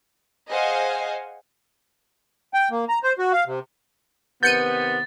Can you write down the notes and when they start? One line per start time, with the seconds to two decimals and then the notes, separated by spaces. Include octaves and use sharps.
0.50 G#4 C5 D#5 F5 F#5 G#5
2.54 G5
2.71 A#3
2.89 A#5
3.03 C5
3.18 F#4
3.33 F5
3.47 C3
4.43 C3 D#3 B3 G6 A6 C#7 D#7